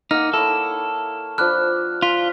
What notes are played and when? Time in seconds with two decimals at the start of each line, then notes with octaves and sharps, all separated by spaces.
0.11 A#3 D#4 F#5 F6
0.34 E4 A4 C#5
1.38 F3 D4 B4 F6 F#6
2.02 F4 B6